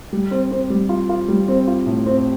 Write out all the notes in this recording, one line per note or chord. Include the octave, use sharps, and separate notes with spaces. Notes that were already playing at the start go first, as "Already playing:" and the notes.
G3
C4
C4
G3
F4
F4
G3
C4
F4
A2
C4